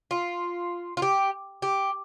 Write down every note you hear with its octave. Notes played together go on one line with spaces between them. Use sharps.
F4
F4
G4
G4